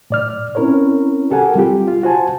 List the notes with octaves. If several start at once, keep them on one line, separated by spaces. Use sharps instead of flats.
A2 D5 F6
C4 C#4 E4 A#4 B4 C#5
F#4 G4 A4 A#4 F#5 G#5
G3 C4 F4 G4
F4
F#4 C5 G#5 A5